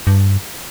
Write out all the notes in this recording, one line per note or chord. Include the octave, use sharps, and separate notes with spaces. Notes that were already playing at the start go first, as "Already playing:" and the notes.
G2